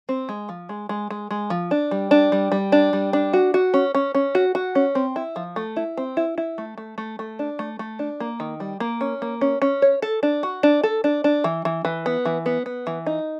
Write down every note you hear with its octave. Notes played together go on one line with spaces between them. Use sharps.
C4
G#3
F3
G#3
G#3
G#3
G#3
F3
D4
G3
D4
G3
G3
D4
G3
D4
F#4
F#4
C#4
C#4
C#4
F#4
F#4
C#4
C4
E4
F3
A3
E4
C4
E4
E4
A3
A3
A3
A3
D4
A3
A3
D4
A#3
D#3
G3
A#3
C#4
A#3
C#4
C#4
C#5
A4
D4
F#4
D4
A4
D4
D4
E3
E3
E3
B3
E3
B3
B3
E3
D#4